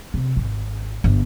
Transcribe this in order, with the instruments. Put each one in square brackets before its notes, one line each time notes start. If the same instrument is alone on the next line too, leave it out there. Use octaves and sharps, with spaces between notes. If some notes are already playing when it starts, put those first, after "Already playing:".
[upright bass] C3
G#1
G1